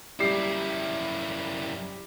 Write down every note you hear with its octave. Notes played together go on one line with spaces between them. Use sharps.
F#2 G3 E4 G4 C7